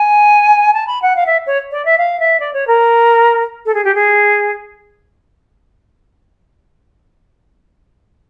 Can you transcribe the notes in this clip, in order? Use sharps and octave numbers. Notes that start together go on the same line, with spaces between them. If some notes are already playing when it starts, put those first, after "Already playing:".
Already playing: G#5
A5
B5
F#5
F5
E5
C#5
D5
E5
F5
E5
D5
C#5
A#4
A4
G#4
G4
G#4